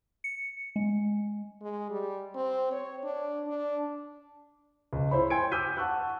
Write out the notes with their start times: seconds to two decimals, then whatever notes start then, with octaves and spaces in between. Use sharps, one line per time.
0.24 C#7
0.76 G#3
1.62 G#3
1.90 G3
2.35 C4
2.72 C#5
3.04 D4
3.47 D4
4.93 C#2
5.11 E4 C5 C#5 B5
5.30 G5 G#5 C6 G#6 C#7 D7
5.51 D6 E6 F6 G6 B6 D#7
5.77 F#5 A5 C#6 E6 F#6